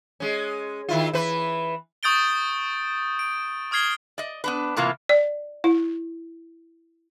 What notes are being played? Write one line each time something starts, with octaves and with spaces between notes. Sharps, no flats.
G#3 C#4
D#3 E4 F4
E3 B4
C#6 D#6 G6 A6 D7 G7
D7
C#6 D#6 F6 G#6 C7 G7
D5 D#5
B3 D4 B4
A2 C3 E3 A#3 F4
D5
E4